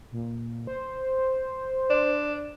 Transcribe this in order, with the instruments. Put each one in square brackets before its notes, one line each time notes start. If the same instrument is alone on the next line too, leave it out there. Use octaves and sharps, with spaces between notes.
[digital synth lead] A#2
C5
[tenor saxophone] D4